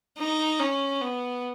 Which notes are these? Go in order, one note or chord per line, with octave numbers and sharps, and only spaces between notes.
D#4
C#4
B3